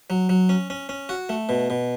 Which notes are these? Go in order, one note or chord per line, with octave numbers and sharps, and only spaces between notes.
F#3
F#3
C#4
C#4
C#4
F#4
A3
B2
B2